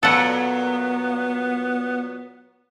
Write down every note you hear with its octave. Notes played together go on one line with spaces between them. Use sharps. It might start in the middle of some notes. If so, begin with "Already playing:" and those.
A#2 F#3 B3 A4 F#5